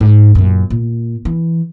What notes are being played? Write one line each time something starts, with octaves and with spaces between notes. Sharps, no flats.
G#2
F#2 A#2
A#2
E3